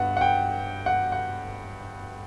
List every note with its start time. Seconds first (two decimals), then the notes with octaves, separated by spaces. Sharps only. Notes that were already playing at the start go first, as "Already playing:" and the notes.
Already playing: G2 B3 F#5
0.17 F#5
0.21 G5
0.86 F#5
1.12 F#5